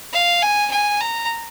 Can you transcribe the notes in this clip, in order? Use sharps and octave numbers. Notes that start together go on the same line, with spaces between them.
F5
G#5
G#5
A#5